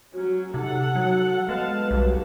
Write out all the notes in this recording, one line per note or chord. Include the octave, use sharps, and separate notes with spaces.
F#3 C#4 F#4
C3 D#4 A4 F#5
F#3 F#4
G#3 B3 B4 F5 A5
B1 F#3 G3 F#4